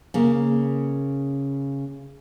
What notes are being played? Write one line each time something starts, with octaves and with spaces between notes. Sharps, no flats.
C#3 A#3